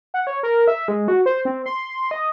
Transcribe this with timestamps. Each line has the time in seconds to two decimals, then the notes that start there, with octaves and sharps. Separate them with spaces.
0.14 F#5
0.27 C#5
0.43 A#4
0.68 E5
0.88 G#3
1.08 F#4
1.26 C5
1.45 C4
1.66 C6
2.11 D#5